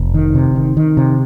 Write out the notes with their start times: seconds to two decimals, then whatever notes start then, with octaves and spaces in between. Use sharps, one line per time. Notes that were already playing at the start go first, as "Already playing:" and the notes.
Already playing: F1
0.14 D#3
0.35 C3
0.56 D#3
0.77 D#3
0.97 C3